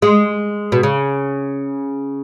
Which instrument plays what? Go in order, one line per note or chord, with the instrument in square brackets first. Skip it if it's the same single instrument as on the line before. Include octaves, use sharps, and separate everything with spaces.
[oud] G#3
B2
C#3